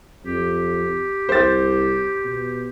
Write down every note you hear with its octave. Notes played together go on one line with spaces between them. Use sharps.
F2 G4
C2 C5 A6
B2